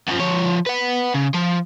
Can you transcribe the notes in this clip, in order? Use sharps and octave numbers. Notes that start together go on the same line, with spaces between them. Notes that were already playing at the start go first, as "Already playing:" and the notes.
F#2 F3
F3 C#5
B4 F#5
C#3
F3